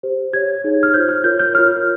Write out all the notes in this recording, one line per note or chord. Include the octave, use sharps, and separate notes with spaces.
G4 C5
G4 C#5 G#6
D#4 G#4 C#5
F6
F4 C5 G6
F6
F4 A#4 C#5 G6
G6
F4 A#4 C#5 F6